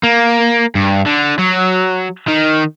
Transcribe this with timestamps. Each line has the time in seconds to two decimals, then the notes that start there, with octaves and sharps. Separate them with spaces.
0.03 A#3
0.75 G2
1.06 D3
1.39 F#3
2.28 D#3